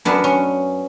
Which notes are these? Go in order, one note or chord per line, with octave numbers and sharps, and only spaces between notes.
F#2 B3 D4
C#4